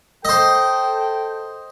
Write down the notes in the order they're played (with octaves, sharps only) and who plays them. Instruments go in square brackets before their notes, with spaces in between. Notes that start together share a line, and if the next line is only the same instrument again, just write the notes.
[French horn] A4 [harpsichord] C5 D#5 [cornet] G5